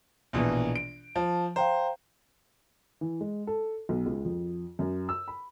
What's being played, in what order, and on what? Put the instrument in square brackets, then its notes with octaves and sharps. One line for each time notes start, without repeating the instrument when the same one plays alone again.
[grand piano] A#1 B2 E3
D7
[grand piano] F3 [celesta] A5
[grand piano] C5 [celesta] F5 G5 A#5
[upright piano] E3
G#3
A4
B1
C#2
F2
F#2
E6
B5